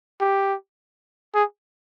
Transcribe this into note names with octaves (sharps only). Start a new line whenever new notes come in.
G4
G#4